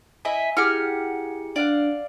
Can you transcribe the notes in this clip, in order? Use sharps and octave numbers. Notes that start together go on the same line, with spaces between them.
E4 D#5 E5 G#5
E4 G4 G#4 F#5 F6 C#7
F#5
D4 D5 F5 F#5